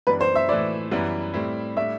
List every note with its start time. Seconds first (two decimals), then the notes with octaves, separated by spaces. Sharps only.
0.07 F#2 E3 G3 B3 D4 B4
0.21 C5
0.36 E5
0.49 A2 E3 A3 E4 D5
0.91 F#2 E3 G3 B3 E4
1.34 A2 G3 C4 E4
1.77 A2 G3 D4 E5